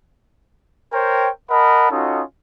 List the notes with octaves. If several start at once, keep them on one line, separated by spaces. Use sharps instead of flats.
A#4 C5 C#5 G5
A#4 D#5 F#5 A5 B5
C#4 D#4 F4 F#4 A4 D#5